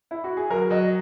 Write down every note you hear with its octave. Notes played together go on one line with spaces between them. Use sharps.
E4
F#4
G#4
F#3 A#4
F#3 D#5